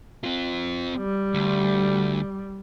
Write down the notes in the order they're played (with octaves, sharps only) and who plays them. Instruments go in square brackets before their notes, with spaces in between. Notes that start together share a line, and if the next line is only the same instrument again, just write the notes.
[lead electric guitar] C4 F4
[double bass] G3
[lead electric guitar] D2